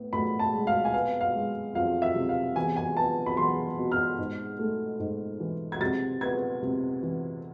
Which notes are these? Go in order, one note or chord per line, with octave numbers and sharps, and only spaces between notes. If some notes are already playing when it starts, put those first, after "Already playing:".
Already playing: A2 B3
A2 B5
A5
G#3
F5
G#5
B3 F5
F5
G#3
F2 F5
E5
C3
F5
E2 G#5
G#5
B3 A5
B5
E2 C6
B2
F6
G#2
A3
G#2
E3
G#6
C3 A6
B3 G#6
C3
E3